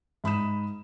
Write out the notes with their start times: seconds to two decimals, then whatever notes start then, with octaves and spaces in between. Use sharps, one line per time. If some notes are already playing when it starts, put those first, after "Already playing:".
0.24 G#2 B5 D#6 E7